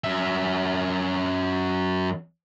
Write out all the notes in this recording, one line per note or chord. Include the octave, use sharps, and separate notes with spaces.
F#2 E5